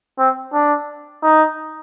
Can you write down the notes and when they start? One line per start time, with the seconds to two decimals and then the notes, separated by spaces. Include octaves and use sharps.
0.18 C4
0.53 D4
1.22 D#4